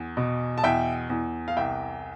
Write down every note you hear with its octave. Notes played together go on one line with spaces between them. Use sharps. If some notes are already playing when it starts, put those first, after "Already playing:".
Already playing: E2
B2
A5
E2 E5 G5
E2
F5
C2 E5 G5